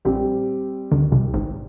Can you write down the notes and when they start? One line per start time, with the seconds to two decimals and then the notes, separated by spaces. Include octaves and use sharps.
0.05 A#1 A#2 G3 C4 G4
0.91 D2 D3
1.12 C2 C3
1.34 G#1 G#2